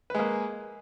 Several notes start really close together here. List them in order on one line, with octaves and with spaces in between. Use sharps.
B4 G#3 A#3